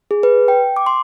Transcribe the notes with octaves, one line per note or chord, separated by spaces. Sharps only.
G#4
B4
G5
D6
C6